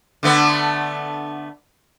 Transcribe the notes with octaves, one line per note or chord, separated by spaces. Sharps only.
D3 A3 B3